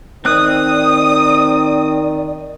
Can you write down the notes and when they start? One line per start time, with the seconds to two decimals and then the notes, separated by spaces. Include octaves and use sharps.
0.25 D#3 C4 D5 D#6 F#6